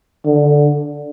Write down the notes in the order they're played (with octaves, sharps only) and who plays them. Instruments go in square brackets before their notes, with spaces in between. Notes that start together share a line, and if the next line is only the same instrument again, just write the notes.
[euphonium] D3